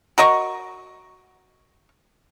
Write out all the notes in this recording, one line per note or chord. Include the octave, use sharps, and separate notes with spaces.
F#4 A#4 D#5 C#6